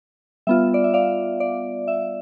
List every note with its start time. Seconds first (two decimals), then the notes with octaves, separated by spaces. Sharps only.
0.47 G3 B3 F4 E5
0.74 D5
0.84 E5
0.94 D5 F5
1.40 D5
1.88 E5